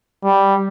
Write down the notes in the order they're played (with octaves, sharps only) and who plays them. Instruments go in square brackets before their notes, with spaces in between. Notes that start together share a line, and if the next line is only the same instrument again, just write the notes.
[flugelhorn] G3